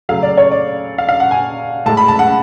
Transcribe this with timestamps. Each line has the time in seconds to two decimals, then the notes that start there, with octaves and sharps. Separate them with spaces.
0.09 C#3 F#3 A3 F5
0.23 D5
0.37 C#5
0.51 D5
0.98 F5
1.09 F5
1.20 F#5
1.31 G#5
1.86 A2 G#3 A5
1.97 B5
2.08 A5
2.19 F#5